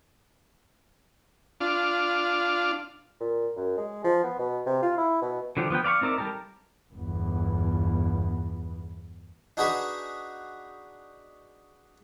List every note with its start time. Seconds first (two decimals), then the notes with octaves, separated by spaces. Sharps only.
1.60 D4 F4
3.20 A#2
3.56 F#2
3.78 G#3
4.04 F3
4.24 B3
4.38 B2
4.66 C3
4.83 F4
4.97 E4
5.22 B2
5.57 D3 F3 F#3 G4
5.70 F3 B3 B4 G5
5.84 D5 F5 B5 C#6
6.01 C4 D#4 A#4 D5 E5
6.18 G3 G4 A4 A#4
6.94 G1 E2
9.57 D4 D#4 F#4 G#4 B4 F#5